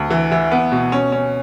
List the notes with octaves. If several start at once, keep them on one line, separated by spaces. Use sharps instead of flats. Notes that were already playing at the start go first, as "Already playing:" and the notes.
Already playing: D2
E3
E3
B3
B2
C#4
C#4